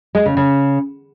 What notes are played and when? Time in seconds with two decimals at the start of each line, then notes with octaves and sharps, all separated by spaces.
0.15 G#3
0.26 C#3
0.37 C#3